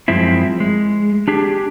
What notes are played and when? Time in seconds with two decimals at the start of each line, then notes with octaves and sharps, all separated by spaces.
0.08 F#2 F3 G#3 C4 E4
0.60 G#3
1.28 D4 G4 G#4